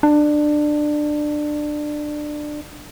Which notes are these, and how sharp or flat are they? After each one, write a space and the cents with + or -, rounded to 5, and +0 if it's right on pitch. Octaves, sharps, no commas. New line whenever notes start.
D4 +20